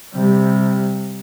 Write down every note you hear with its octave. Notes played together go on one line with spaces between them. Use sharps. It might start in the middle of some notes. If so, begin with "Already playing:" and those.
C3 G3